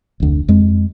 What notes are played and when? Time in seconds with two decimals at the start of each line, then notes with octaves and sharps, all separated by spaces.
0.20 F1 D2
0.48 F2 G#3